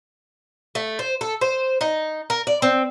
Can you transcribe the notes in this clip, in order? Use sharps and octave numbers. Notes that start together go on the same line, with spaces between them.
A3
C5
A4
C5
D#4
A#4
D5
C4